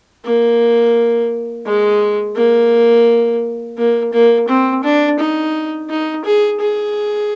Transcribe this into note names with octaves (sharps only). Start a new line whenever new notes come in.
A#3
G#3
A#3
A#3
A#3
C4
D4
D#4
D#4
G#4
G#4